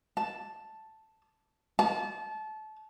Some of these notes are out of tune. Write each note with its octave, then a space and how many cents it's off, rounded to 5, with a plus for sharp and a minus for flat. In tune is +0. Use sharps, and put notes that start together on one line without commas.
A5 +0
A5 -25